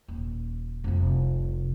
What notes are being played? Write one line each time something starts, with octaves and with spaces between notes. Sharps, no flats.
D#1
F1 C2